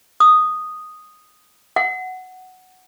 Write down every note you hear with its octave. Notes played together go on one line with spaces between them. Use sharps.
D#6
F#5